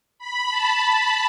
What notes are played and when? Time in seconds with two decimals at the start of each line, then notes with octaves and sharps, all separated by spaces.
0.19 B5
0.50 A5